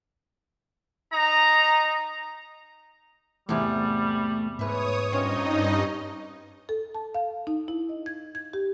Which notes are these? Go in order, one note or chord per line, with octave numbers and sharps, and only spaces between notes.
D#4 A#5
E2 G#2 C3 G3 A3
G#2 B4 C#5 E5 D#6
G2 C4 C#4 D#4 F4 C#5 D#5
A4
A5
F5
D#4
E4
D#5
G#6
G#6
G4